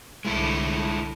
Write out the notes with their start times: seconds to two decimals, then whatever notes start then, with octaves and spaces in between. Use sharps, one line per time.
0.25 C2 D3 G#3 E4 A4